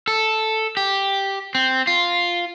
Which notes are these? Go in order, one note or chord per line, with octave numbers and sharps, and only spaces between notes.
A4
G4
C4
F4